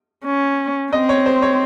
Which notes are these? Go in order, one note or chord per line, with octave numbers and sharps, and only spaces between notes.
C#4
C4 D#5
C#5
C5
C#5